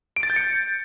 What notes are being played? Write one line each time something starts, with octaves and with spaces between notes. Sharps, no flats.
D7
A6
G6
C#7